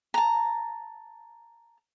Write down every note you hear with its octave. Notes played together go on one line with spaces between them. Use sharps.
A5 A#5